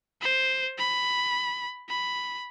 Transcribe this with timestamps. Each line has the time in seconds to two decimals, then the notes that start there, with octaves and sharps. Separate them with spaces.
0.22 C5
0.78 B5
1.89 B5